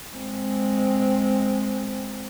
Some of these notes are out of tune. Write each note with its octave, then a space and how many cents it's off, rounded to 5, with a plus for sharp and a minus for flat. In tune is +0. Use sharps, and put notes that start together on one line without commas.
G#3 +0 C4 +0